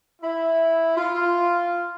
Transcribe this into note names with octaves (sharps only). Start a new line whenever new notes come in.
E4
F4